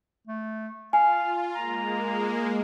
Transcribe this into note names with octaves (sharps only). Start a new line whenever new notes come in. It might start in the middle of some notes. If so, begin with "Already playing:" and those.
A3
F4 F5 G#5
G#3 A#3 A#5